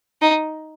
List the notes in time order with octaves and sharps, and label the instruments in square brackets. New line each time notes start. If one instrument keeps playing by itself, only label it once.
[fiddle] D#4